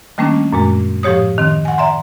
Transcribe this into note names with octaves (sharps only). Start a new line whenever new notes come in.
D#3 G3 A3 A#3 C#4 D4
F#2 A#2 G#3
A2 F3 G4 C#5 D#6
D#3 C4
F#5 G#5
D5 E5 A#5 C6